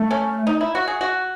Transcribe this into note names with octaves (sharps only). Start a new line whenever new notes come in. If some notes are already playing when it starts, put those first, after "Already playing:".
Already playing: A3
C#4
D#4
E4
F#4
G#4
F#4